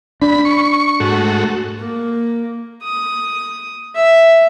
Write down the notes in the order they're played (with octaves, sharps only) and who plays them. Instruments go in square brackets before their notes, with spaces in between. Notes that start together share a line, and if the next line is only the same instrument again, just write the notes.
[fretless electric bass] D4 [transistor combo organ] B5
[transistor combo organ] C#6
G#2 A3 F#4
[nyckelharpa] A#3
D#6
E5